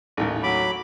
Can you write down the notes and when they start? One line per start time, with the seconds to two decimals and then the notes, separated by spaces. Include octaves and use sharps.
0.17 A1 D#2
0.43 F#3 B5 D6